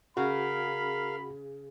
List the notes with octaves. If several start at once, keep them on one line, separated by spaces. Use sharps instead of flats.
C#3 F#4 A#4 F5 B5